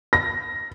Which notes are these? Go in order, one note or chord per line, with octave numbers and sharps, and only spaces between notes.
A#6